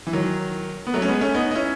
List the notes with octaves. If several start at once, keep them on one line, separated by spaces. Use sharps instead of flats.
E3
D#3 F#3
B3
F#3 A3
C#4
G#3 B3
A3 C#4
B3 D#4
D#4
C#4 E4